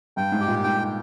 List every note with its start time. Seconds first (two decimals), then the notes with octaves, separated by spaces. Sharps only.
0.17 G2 G5
0.32 G#2
0.41 G4
0.48 A#2
0.63 G#2 G5